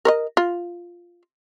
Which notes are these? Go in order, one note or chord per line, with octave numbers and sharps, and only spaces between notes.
A#4 C#5 D#5
F4